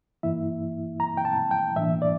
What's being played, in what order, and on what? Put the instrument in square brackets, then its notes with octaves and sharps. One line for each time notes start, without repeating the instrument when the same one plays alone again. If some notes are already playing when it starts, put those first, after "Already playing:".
[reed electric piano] G2 E3 A#3 E4 E5
A#5
G5
A5
G5
A2 E3 A#3 D4 E5
D5